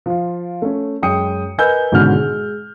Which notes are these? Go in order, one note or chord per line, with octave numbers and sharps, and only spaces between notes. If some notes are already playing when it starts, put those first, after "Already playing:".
F3 F4
A3 C#4
F#2 G#3 G5 D#6 C#7
A#4 B4 D#5 G#5 E6 G6
G#1 G#2 B2 D3 C#4 F6
G#3